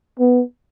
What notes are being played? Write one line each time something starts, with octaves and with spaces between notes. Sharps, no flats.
B3